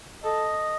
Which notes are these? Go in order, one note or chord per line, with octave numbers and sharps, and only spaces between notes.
A4 D#5